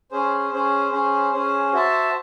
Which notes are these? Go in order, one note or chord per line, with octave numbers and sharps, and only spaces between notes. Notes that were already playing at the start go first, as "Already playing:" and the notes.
C#4 G#4 C5
C#4 G#4 C5
C#4 G#4 C5
C#4 G#4 C5
F#4 C5 E5 A5